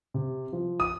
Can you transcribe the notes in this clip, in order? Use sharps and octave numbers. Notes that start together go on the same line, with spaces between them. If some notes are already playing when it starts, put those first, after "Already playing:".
C3
F3
D#6